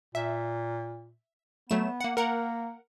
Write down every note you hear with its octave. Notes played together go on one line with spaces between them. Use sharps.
A#2 E5
F#3 A3 B3 E7
A#3 F#5
A#3 A#4 F#5 A#5